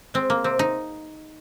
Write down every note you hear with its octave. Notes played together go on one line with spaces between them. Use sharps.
G#3 C4
A#3
C3 C4
D#4